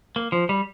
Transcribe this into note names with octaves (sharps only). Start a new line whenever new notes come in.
A#3
F3
G3